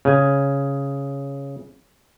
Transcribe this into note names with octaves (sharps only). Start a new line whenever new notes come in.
C#3 G#5